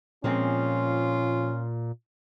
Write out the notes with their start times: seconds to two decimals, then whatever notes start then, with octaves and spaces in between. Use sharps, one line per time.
0.24 A#2 F3 G#3 C4 C#4 F4